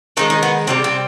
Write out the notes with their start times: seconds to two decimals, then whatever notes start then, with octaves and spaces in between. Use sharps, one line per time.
0.17 D#3 G#3 D#4
0.30 D#4
0.43 B3
0.67 C3 E3 G3 C4
0.84 C4